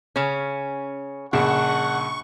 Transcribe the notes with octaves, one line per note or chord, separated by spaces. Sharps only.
C#3 C#4
A#1 C#3 D4 F#5 C#6